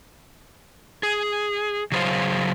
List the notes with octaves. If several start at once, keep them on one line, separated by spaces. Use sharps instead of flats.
G#4
C#3 F#3 G#4 B4 C5 F5